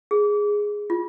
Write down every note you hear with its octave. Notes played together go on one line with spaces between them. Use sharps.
G#4
F4